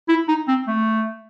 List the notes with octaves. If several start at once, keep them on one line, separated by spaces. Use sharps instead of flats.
E4
D#4
C4
A3